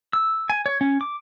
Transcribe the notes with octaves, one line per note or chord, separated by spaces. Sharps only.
E6
G#5
C#5
C#4
D6